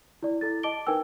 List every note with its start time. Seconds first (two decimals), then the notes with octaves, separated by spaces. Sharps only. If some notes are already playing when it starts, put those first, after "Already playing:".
0.23 E4 D5
0.41 E4 A4 A6
0.63 D#5 A5 D6 D7 G7
0.87 D#4 A#4 B4 G5 G#5 E6